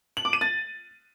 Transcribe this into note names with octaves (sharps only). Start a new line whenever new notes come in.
F#7
D6
D#7
A6